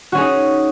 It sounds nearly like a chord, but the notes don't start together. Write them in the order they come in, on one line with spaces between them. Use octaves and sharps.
F#4 C#4 G#4 D#4